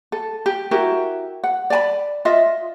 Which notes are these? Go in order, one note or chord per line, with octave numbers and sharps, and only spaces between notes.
A4
G4
E4 F#4 G4 A#4
F#5
D5 G#5 B5
F4 D#5 E5